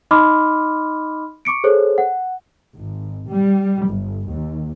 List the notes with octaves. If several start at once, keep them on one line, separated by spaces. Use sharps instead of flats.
D#4 D#5 B5 C6 D6 F6
C#6 D6 C#7 D7
G#4 A4 C5 C#5
F#5
G#1
G3
G1
D#2